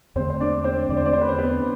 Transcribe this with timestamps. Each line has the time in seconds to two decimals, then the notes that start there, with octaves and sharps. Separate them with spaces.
0.15 E2 D3 A3 C4 C5
0.30 C5
0.40 D4 D5
0.64 C4 C5
0.89 E2 D3 A3 D5
0.97 C5
1.05 D4 D5
1.13 C5
1.21 B4
1.29 C4 C5
1.39 B3 B4